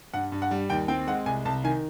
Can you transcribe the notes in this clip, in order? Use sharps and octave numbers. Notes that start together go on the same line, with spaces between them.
G2 F#5
G2
F#5
G3
D#2 G5
C4 G5
G#3 F#5
C2 G#5
C2 A5
D#3 G#5